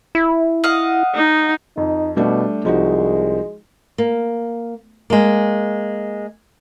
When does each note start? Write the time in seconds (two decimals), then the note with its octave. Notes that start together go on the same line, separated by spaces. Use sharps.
0.15 E4
0.64 D#5 F5 F#5
1.15 D#4
1.77 F2 D#4
2.17 B2 G3 A3 D4
2.65 C2 F3 G#3 D#4 F#4
3.98 A#3
5.10 G#3 A#3